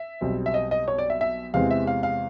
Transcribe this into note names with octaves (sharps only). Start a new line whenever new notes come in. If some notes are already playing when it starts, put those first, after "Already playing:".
Already playing: E5
B1 B2 G3 C4
E5
D#5
D#5
C#5
D5
E5
E5
E2 C3 E3 G#3 C4 F5
E5
F5
F5